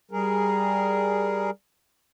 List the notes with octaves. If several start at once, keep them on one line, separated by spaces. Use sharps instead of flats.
G3 G#4 A#4